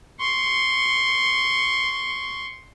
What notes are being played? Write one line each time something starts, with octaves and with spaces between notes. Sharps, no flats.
C6 C#6